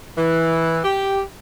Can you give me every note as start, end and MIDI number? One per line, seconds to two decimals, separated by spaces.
0.18 0.78 52
0.84 1.21 67